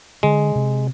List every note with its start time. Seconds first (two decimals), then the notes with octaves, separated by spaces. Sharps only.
0.23 D3 G#3
0.55 C3